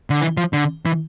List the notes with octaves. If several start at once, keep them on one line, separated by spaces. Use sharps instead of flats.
D3
E3
F3
D3
E3